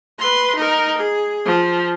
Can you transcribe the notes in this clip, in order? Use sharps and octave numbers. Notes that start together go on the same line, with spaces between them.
B4 C6
D#4 A#4
G#4
F3